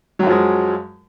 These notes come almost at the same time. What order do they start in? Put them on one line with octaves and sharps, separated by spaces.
F#3 F#2 F3 G#3